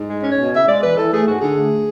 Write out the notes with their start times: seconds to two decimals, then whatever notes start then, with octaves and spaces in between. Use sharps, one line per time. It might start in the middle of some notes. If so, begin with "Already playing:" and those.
Already playing: G#2
0.09 G#3
0.23 C#4
0.31 C#5
0.38 B2
0.52 C#3 E5
0.67 G#3 D5
0.82 E2 B4
0.97 E3 A4
1.12 A3 G#4
1.26 G#2 F#4
1.41 D3 G#4
1.55 A3